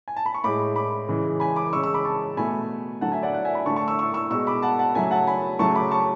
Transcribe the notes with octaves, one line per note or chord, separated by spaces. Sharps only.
G#5
A5
B5
C#6
A2 G#3 B5 D6
B5 D6
C#3 E3 G#3
G#5 B5
B5 D6
C#3 G#3 C#6 E6
C#6 E6
B5 D6
A5 C#6
B2 A3 G#5 B5
D3 F#3 A3 F#5 A5
E5 G#5
D5 F#5
D5 F#5
E5 G#5
G#5 B5
D3 A3 A5 C#6
A5 C#6
C#6 E6
C#6 E6
C#6 E6
B2 G#3 C#6 E6
B5 D6
F#5 A5
F#5 A5
C#3 F#3 A3 E5 G#5
F#5 A5
G#5 B5
C#3 F#3 A3 A5 C#6
B5 D6
A5 C#6